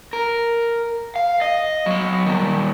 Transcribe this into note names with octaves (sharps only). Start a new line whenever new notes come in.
A#4
F5
D#5
F#3 D#5
D#3 G3